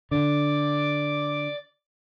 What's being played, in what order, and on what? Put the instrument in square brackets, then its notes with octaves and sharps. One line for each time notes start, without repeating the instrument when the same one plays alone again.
[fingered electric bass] D3 [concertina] D5 D6